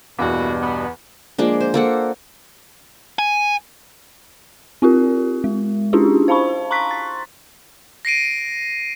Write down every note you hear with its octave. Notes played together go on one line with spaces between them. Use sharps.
E2 G2 B2 A#3 E4 F#4
B3
F3 G#3 A#3 D4
C5
A#3 A4 F#5
G#5
C4 F4 G4 A#4
G#3
C#4 D4 E4 F4 G4 G#4
C5 F5 A5 B5 C#6
A#5 C6 C#6 F#6 B6
A6
A#6 C7 D7 D#7